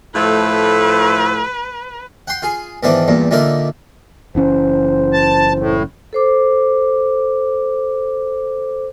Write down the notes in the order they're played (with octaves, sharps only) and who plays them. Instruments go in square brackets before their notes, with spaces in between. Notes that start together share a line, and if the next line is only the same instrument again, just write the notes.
[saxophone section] A2 F3 A3 [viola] B4
[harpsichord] F#5 G5 C6
F4 G#4
G#2 D#3 E3 B3 D4 E4
E2 G2 A#2
A#2 D3 D#4 E4 A#4 A#5
[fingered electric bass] F#1 E3 C#4 [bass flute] C5
[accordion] A5
A2
[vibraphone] A4 C5 D6